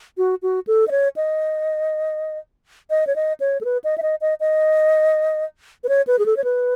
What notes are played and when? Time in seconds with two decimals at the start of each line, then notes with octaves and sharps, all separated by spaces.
0.17 F#4
0.42 F#4
0.67 A4
0.88 D#5
0.91 C#5
1.16 D#5
2.90 D#5
3.07 C#5
3.16 D#5
3.40 C#5
3.61 A4
3.65 B4
3.84 D#5
3.98 E5
4.02 D#5
4.21 D#5
4.40 D#5
5.84 B4
5.89 C#5
6.07 B4
6.19 G#4
6.26 A4
6.36 C#5
6.44 B4